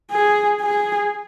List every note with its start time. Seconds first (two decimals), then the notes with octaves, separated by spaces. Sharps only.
0.12 G#4
0.61 G#4